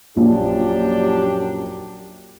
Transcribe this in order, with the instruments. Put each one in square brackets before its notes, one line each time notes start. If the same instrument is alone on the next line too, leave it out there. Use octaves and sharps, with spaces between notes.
[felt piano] A#1 [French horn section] F#2 D4 G4